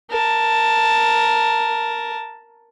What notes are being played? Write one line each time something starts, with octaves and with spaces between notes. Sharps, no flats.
A#4 A5